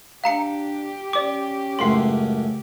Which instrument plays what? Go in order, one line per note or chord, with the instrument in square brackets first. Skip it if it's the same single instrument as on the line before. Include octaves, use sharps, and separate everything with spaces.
[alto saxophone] D4 [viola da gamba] G4 [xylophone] F5 A#5 C#7
[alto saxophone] C#4 [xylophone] D5 D6
[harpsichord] C#2 F#2 A2 [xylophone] C6 C7